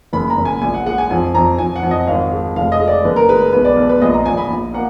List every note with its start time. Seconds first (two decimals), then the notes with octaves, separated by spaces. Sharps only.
0.13 F#1 B5
0.30 A#5
0.37 F#1
0.45 G#5
0.61 A#1 G#5
0.74 F#5
0.85 G#3 F#5
0.98 G#5
1.10 F2 G#5
1.34 F2 A#5
1.58 F2 G#5
1.76 F#5
1.83 F2
1.91 D#5
2.07 G#1 F5
2.32 G#3
2.56 F1 F5
2.72 D#5
2.80 G#3
2.88 D5
3.04 F#1 B4
3.16 A#4
3.29 G#3 B4
3.53 B1 B4
3.65 D5
3.77 B1
3.89 B4
4.02 A#1 D#5
4.14 A#5
4.25 A#1 G#5
4.37 B5
4.50 A#1
4.74 A#3 F#5